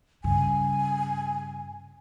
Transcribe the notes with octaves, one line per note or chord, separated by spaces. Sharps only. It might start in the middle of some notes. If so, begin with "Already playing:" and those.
G2 C#3 G#5